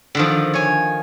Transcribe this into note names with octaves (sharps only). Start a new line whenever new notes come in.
D3 D#3 F3
C#5 G#5